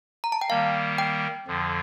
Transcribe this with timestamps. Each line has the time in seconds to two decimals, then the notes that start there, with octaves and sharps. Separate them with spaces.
0.24 A#5
0.32 A5
0.41 G5
0.49 D#3 G3 A#3 F5
0.98 G5
1.47 F2 D3 F3